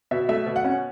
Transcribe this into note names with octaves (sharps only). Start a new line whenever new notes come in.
B2 E5
A3 E5
B2
F#5
C#4